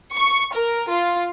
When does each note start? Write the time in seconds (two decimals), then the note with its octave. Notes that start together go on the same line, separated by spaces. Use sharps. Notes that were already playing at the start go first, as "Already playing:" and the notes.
0.15 C#6
0.54 A#4
0.91 F4